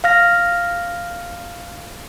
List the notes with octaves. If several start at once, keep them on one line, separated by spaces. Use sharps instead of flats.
F5 F6 A#6